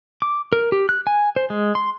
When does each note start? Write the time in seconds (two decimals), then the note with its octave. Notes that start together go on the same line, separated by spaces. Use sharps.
0.22 D6
0.53 A#4
0.72 G4
0.89 F#6
1.07 G#5
1.36 C5
1.50 G#3
1.75 C6